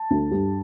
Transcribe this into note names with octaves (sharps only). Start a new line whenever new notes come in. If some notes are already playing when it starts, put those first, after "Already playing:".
Already playing: A5
D2
G2